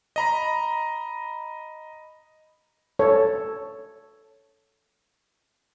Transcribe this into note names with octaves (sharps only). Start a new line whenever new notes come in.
D#5 A#5 B5
A4 C#5